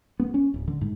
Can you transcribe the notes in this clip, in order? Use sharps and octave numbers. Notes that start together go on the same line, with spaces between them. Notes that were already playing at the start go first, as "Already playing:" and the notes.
B3
C#4
D1
D3
G#2